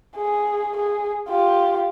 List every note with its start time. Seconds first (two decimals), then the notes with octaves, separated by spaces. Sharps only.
0.16 G#4
0.77 G#4
1.28 F4 G4